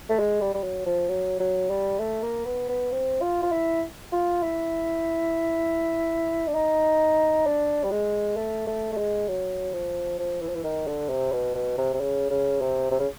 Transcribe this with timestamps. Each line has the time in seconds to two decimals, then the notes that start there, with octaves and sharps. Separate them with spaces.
0.09 A3
0.19 G#3
0.41 G3
0.54 G3
0.63 F#3
0.86 F3
1.09 F#3
1.40 F#3
1.70 G3
2.00 A3
2.23 A#3
2.45 B3
2.69 B3
2.92 C4
3.21 F4
3.42 F4
3.52 E4
4.13 F4
4.42 E4
6.47 D4
6.55 D#4
7.46 D4
7.84 G3
7.91 G#3
8.37 A3
8.67 A3
8.93 A3
8.97 G#3
9.28 F#3
9.73 F3
10.19 F3
10.42 E3
10.48 F3
10.56 E3
10.64 D#3
10.87 D3
11.09 C3
11.32 B2
11.55 B2
11.78 C3
11.93 C3
12.01 C#3
12.30 C#3
12.61 C3
12.91 C3
13.00 C#3